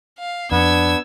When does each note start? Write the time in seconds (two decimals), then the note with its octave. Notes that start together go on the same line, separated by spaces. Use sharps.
0.19 F5
0.52 F2 B3 D4 E6 G#6